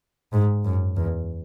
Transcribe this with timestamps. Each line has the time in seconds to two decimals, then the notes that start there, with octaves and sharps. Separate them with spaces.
0.33 G#2
0.65 F#2
0.96 E2